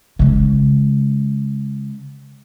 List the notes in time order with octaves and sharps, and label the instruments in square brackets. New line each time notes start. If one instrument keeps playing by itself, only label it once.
[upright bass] C#3 G#3